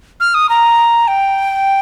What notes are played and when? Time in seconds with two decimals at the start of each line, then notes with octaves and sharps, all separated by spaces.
0.20 F6
0.34 D#6
0.49 A#5
1.08 G5